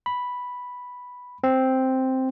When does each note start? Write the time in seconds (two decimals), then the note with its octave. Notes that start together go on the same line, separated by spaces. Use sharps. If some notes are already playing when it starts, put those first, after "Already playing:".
0.06 B5
1.44 C4